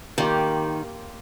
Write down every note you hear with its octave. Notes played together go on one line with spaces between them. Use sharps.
D#3 A#3 F4 G4